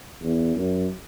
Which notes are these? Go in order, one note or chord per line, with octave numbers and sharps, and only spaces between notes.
E2
F#2